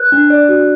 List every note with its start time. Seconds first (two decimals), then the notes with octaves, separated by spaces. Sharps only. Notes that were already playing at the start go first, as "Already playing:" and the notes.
Already playing: B4 F#6
0.12 D4
0.30 D5
0.49 F#4